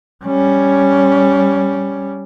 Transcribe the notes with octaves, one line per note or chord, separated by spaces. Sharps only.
G3 C#4